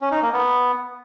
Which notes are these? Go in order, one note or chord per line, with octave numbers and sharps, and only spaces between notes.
C#4
D#4
A#3
B3